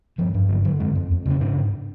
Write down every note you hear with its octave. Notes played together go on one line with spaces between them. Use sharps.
G2 F3
G2
D3 F#3
D3 F#3
F2 G#3
F2
F2
C#3 C#4
G#2 D4
G#2